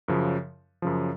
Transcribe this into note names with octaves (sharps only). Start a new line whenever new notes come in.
F#2 C#3 F3
F#2 C#3 F3